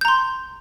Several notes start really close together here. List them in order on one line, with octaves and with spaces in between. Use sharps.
G6 A#5 C6